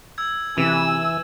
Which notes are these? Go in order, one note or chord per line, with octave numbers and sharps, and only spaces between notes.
E6 G#6
C3 E3 G#5 E6 D#7